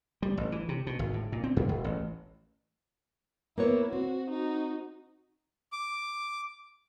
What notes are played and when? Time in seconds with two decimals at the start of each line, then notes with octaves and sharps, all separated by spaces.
0.22 G3
0.37 A1
0.52 E3
0.69 C3
0.87 B2
0.99 G#1
1.14 A2
1.32 A#2
1.44 C4
1.57 F#2
1.69 E1
1.84 A1
3.58 A#3 B3 E4 C#5
3.93 C4 F#4
4.31 D#4 F#4
5.72 D6